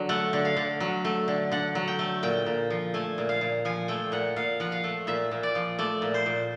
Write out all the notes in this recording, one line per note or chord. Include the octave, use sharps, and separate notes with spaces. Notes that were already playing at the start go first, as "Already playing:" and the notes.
Already playing: D3 F#3
A3 F#5
D3
F5
D3
F#3
A3
D3
D3 F#5
F#3
G5
A3
A#2 G5
A#2
F3
A3 G#5
A#2
F5
A#2
F3 G#5
A3 G5
A#2 F#5
A#2 F5
F3 F#5
F5
A3
A#2 E5
A#2
D5
F3
A3 D5
A#2
C5
A#2